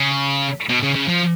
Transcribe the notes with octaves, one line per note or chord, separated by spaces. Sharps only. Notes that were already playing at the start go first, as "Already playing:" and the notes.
Already playing: C#3
B2
C#3
C#3
F3